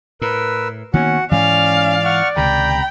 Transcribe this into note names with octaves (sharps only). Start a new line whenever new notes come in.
A2 A#4 B4 E6
D#3 A#3 B3 C#4 F#4 F#5
G#2 E3 C#4 D5 F5
F#5 C#6 F6
C#2 C3 D#3 G5 A#5 B5